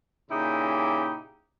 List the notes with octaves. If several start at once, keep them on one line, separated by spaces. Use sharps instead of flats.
A#2 C#3 D#4 E4 G4